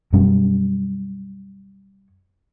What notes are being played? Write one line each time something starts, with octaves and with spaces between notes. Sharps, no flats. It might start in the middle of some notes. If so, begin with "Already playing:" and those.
F#2 B2 G3 C#4